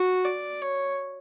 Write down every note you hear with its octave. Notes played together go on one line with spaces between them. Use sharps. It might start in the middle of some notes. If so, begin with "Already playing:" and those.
Already playing: F#4
D5
C#5